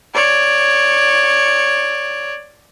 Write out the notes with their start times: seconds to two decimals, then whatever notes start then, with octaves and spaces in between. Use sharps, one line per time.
0.14 C#5 D5